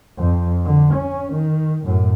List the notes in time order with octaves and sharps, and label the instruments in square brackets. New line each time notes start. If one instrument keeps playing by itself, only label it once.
[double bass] F2
D3
C#4
D#3
F#2 A2